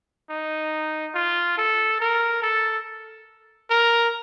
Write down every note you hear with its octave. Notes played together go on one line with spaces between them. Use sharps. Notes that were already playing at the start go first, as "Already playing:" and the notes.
D#4
F4
A4
A#4
A4
A#4